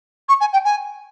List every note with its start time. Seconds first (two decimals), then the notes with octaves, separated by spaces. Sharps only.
0.29 C#6
0.40 G#5
0.53 G5
0.65 G#5